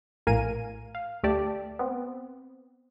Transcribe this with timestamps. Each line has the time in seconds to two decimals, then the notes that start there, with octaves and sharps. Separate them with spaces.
0.27 A#1 A2 A#4 F5 G#5 D#7
0.95 F5
1.23 D2 A3 G4 D5 A5
1.79 B3 C4